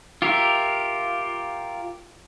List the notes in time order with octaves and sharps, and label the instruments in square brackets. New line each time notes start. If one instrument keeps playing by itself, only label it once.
[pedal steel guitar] F4 G4 A#4 E5